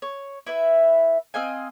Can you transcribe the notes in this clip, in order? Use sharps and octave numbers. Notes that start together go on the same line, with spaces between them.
C#5
E4 B4 E5
C4 D#5 F5 G#5